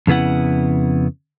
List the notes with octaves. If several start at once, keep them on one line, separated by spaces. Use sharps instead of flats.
F2 C#3 B3 E4 F#5